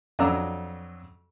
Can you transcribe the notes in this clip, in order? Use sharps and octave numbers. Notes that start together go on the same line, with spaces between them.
F2 F#3 D4 A#5 D6 E6